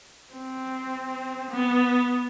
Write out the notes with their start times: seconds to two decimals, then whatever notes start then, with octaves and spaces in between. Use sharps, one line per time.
0.33 C4
1.50 B3